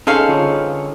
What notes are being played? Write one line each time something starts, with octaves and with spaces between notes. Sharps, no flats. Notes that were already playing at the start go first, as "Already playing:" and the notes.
C#4 D#4 G#4 A4 C5 F5
D3 F4 C#5